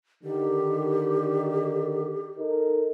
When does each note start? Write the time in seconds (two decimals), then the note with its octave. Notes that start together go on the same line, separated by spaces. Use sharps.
0.24 D3 D#3 G4
2.38 D#4 A4 A#4